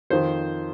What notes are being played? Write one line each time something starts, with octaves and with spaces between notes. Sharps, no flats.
F2 D#3 C5